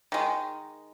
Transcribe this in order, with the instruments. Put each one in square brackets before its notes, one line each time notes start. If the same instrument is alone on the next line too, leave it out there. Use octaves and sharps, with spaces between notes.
[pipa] D#3 G#3